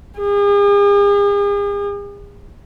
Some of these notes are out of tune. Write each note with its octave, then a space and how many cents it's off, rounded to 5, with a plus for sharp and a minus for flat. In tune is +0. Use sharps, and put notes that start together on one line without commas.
G#4 -45